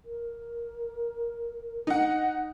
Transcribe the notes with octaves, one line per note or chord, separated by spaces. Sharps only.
A#4
D#4 F#5